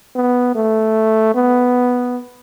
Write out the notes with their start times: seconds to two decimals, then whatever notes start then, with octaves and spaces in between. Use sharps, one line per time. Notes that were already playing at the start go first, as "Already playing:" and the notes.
0.16 B3
0.55 A3
1.35 B3